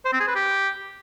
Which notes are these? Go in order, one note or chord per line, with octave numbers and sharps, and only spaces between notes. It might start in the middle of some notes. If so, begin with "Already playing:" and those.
C5
C4
G#4
B4
G4